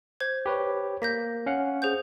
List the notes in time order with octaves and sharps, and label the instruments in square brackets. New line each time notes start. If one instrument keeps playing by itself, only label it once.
[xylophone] C5 G#6
[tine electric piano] G4 B4 C#5
[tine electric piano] A#3 [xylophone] G6 A#6 B6
[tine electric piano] C#4 F5 F#5
[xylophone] G#4 C5 G6